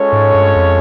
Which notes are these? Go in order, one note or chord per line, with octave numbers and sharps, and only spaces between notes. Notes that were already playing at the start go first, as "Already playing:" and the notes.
Already playing: G#3 C#4 F4 A4 C#5
G#2
G2
F2